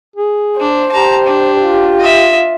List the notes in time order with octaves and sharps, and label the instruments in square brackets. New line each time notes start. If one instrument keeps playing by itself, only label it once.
[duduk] G#4
[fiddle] D4 [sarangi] C5
[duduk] G4 [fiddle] A5 A#5
[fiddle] D4
[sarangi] F4
[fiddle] D#5 E5